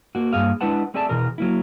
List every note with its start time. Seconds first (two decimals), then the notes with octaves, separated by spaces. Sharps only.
0.15 A#3 F#4
0.33 G2 A#3 G#4 F5
0.61 G#3 D4 E4 B4 F#5 A5
0.94 A3 C4 G#4 D5 E5 A5
1.09 B2 E3 G#4 A#4
1.38 F#3 A#3 E4